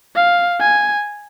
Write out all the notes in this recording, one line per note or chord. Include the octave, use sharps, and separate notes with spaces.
F5
G#5